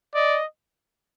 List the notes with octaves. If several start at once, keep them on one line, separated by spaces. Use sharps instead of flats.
D5 D#5